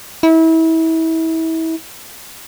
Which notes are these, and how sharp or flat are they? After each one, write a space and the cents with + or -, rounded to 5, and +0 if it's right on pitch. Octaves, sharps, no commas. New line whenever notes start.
E4 -30